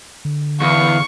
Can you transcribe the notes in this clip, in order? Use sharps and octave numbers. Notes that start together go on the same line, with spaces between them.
D3
E2 F5 C#6